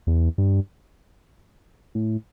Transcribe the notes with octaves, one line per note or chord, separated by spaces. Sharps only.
E2
G2
A2